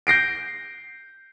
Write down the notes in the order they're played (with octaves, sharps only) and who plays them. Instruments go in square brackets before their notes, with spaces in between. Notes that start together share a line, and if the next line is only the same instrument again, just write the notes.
[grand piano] G6 A#6 C7 D7